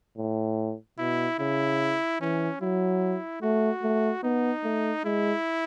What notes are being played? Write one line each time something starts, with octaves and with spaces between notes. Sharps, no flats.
A2
B2 E4
C#3 E4
E3 C#4
F#3 E4
A3 F#4
A3
B3 D#4
A3
G#3 E4